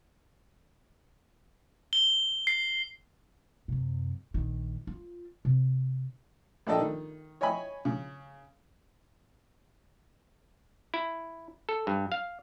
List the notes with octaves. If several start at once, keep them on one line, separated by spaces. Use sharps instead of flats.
G7
C7
F#2 C3
A#1 D#3
F4
C3
A#1 D4 A4 D#5 G5
D#3
C#5 D#5 G5 G#5 B5
C#3
E4
A4
G2
F5